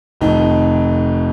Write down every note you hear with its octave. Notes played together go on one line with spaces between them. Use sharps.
F1 F2 D#3 D#4